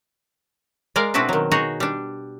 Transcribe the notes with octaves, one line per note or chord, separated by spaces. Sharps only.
G#3 A#4 D5 F5
B2 C4 D4 E4 F#4 B4
D#3 F#3
D#4 F#4 G#4 C#5
G3 D4